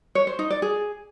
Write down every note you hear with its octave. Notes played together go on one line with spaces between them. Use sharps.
C#5
C5
D#4
D5
G#4